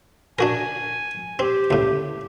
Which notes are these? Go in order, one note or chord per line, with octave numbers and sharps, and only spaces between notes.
D4 F#4 A#4 G#5
C4 G4
C#2 A2